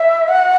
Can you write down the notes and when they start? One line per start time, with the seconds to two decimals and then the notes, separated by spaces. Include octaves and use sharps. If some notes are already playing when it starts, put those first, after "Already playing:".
Already playing: E5
0.28 F#5